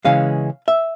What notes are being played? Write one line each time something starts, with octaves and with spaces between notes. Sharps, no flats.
C#3 E3 G#3 C#4 F5
E5